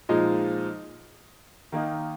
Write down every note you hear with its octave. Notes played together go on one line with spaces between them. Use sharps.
A#2 F3 G#3 D#4
D#3 A#3 D#4